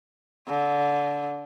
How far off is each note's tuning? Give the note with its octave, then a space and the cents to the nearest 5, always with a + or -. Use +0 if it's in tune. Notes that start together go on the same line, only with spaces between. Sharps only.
D3 -20